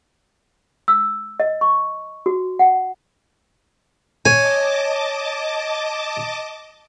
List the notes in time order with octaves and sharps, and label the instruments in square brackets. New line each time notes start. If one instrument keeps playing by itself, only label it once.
[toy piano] E6
D#5
C#6
F#4
F#5
[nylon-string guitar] C#5 [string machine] D#5 A5 D6 [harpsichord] G#5